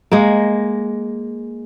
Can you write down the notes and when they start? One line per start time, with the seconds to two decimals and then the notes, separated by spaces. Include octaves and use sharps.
0.12 G#3 A#3